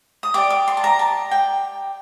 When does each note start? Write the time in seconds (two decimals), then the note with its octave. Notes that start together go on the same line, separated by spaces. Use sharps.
0.23 D#6
0.34 G4 D5 D6
0.50 D6
0.68 C6
0.77 A5
0.84 A#5
0.99 A5
1.31 G5